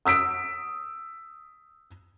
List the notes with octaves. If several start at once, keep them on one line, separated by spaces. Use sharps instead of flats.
D#6 E6 B6 D7